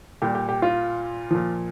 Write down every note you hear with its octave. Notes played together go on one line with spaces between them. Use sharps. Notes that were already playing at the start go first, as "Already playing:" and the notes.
A#2 G3 G4
G4
G4
F4
A#2 F3